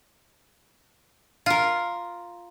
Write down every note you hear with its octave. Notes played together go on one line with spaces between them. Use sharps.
F4 A#4